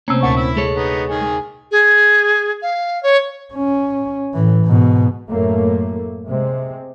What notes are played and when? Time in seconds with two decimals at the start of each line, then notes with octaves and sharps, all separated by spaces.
0.08 C3 A3 A#3 C4 C#4
0.23 D2 A#2 E4 A5 C#6
0.36 E4 E5
0.57 G#3 A4 C#5
0.76 B3 D#4
1.09 D#3 G#4
1.71 G#4
2.62 F5
3.03 C#5
3.54 C#4
4.34 A2 E3
4.65 G#2 B2
5.29 F#2 A2 A3 A#3
6.27 C3 G#3 C4